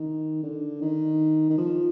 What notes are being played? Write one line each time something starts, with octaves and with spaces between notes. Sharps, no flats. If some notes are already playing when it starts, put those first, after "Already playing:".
Already playing: D#3
D3
D#3
D#3
F3